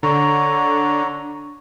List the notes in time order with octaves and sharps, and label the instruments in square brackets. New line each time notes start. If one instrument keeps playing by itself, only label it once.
[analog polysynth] D3 [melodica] C#5 A#5